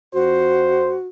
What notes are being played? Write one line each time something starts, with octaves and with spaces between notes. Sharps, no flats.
F2 F#4 C5